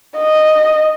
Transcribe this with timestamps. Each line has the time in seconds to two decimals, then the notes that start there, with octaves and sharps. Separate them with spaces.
0.18 D#5